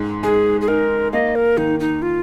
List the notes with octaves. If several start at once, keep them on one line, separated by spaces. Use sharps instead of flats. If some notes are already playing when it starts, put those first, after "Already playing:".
Already playing: G#2 G#3
G#3 G#4
G#4
D#4 A#4
A#3 D#5
A#4
D#3 D#4
D#4
F4